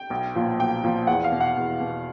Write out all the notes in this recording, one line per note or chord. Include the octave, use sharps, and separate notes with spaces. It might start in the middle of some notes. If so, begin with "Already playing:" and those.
Already playing: G5
B1
A#2 F3
B1 G5
A#2 F3
E2 F#5
F5
B2
F#5
E2
B2